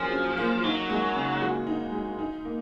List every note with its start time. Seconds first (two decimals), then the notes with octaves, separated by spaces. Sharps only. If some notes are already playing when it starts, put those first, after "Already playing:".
Already playing: F3 F#3 A#3 C#4 G#4
0.12 C#4
0.37 A#3
0.64 F#3 D#4
0.90 G#3
1.15 C#3
1.41 F#4
1.67 D#4
1.92 G#3
2.19 D#4
2.45 A#3